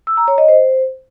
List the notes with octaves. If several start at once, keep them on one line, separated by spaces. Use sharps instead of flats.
E6
A#5
C#5
D#5
C5